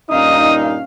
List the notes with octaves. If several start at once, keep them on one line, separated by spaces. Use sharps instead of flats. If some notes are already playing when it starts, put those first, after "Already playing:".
G2 A#2 C#4 D#4 F5 D#6